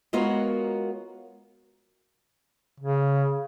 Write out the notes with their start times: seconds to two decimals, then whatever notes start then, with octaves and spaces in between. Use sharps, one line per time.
0.13 G#3 B3 F4 F#4 A#4 C#5
2.80 C#3